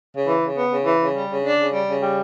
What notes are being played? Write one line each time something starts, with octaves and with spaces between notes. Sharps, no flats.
C#3
E3
C#3
B3
C#3
E3
C#3
G3
C#3
D4
C#3
G3
C#3
G3